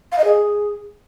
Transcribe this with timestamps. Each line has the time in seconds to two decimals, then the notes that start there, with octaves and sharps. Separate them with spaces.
0.12 F5
0.18 D#5
0.24 G#4